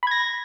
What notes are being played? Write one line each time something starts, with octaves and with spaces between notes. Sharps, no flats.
B5 G#6 A#6